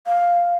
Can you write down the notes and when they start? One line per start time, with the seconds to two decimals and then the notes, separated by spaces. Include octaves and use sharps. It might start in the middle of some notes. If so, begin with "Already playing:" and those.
0.07 F5